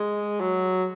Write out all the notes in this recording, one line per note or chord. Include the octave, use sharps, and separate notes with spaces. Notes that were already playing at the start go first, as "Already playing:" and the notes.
Already playing: G#3
F#3